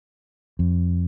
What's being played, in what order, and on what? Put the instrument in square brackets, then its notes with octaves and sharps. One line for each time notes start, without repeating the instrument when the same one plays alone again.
[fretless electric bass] F2